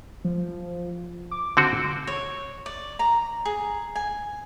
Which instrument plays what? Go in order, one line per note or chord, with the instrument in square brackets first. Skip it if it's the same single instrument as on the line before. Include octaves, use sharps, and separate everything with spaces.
[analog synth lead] F3
D6
[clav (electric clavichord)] D3 C4 F#4 [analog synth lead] D7
[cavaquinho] C#5
D5
A#5
G#4
G#5